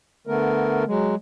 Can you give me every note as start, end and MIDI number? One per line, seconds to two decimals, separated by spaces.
0.27 0.84 50
0.27 0.84 57
0.27 0.84 59
0.27 0.84 70
0.87 1.15 54
0.87 1.15 56